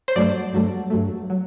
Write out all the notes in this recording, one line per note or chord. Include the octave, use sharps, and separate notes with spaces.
C5
G2 F#3 A3 D5
G2 F#3 A3
G2 F#3 A3
F#3